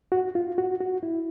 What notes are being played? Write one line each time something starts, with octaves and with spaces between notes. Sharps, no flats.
F#4
F4
F#4
F#4
E4